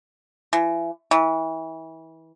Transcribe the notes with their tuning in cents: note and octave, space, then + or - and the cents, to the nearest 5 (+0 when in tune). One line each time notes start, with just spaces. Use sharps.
E3 +30
E3 -30